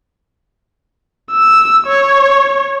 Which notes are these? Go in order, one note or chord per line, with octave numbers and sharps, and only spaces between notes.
E6
C#5